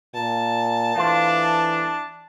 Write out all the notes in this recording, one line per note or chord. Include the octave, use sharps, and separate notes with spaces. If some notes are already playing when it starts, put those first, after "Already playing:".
A#2 A5
E3 A3 D4 F4 C5